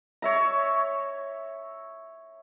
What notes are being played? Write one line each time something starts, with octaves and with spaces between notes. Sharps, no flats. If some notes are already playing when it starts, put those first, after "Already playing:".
C#5 E5 A#5